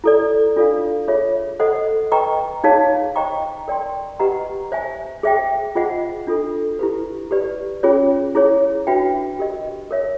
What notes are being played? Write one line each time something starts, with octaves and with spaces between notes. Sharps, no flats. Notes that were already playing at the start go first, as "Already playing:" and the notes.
E4 A4 D5
D4 F4 A4 D5 F5
F4 G#4 C#5 E5
A4 C5 D#5 F#5
B4 D#5 G5 A#5 C#6
D#4 G#4 C#5 F5 A5
C5 D#5 G5 A#5 C#6
A#4 D5 G5 C6
G4 B4 D#5 F#5 A#5
C5 E5 G#5
G#4 C5 E5 G5
F4 G#4 C5 D#5 F#5
D4 F4 A4
E4 G4 B4
G4 B4 D5
C#4 F4 G#4 C#5
E4 G#4 C#5
D4 F#4 B4 E5 G5
G4 A#4 D#5
A#4 C#5 E5